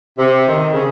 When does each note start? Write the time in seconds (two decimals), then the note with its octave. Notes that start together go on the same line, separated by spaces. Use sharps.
0.18 C3
0.47 D#3
0.72 C#3